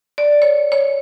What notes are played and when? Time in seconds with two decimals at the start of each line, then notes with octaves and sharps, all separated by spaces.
0.18 D5
0.42 C#5
0.72 C#5